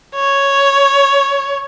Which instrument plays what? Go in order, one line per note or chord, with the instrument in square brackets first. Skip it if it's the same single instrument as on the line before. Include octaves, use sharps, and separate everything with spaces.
[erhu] C#5